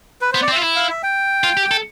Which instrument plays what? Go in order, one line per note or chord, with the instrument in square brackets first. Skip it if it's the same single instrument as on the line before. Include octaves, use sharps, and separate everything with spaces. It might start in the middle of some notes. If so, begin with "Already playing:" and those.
[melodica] B4
[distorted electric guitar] B3 [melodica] C5
[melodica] D5
[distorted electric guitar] C4
[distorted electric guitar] F4 [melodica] E5
[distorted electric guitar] E4
[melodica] F5
E5
G5
[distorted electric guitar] F4
G4
A4